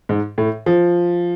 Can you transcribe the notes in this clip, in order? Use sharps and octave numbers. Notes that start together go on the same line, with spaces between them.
G#2
A2
F3